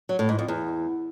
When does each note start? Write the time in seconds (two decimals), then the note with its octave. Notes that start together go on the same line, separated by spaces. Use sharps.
0.09 F#3
0.19 A2
0.29 G#2
0.39 F2
0.48 E2